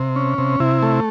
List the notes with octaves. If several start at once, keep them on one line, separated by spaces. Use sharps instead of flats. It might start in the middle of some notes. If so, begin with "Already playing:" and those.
Already playing: C3
C#4
C3
C3 E4
A3